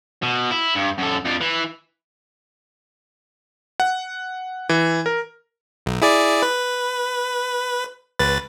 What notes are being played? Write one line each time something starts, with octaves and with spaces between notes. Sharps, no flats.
B2
E4
G2
F#2 A4
F2 D4
E3 E4
F#5
E3
A#4
B1
E4 G#4 D5
B4
C#2 B4 A6